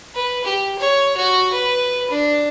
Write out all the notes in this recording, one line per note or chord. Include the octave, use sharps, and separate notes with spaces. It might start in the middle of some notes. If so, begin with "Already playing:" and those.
B4
G4
C#5
F#4
B4
D4